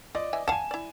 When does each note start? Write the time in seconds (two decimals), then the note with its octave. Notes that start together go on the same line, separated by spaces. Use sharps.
0.15 F4 D5 D#5
0.33 E3 E5 G#5
0.48 F5 F#5 G#5 A5 E7
0.71 E4 D5